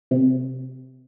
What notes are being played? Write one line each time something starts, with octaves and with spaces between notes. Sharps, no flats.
C3